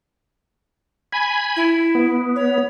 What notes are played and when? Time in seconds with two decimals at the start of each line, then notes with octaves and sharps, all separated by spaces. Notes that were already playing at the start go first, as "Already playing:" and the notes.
1.12 G#5 B5
1.56 E4
1.95 B3
2.36 C#5